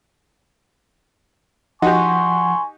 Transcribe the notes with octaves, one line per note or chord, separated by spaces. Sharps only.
F3 D#4 F#4 G4 F#5 G#5 C6 C#6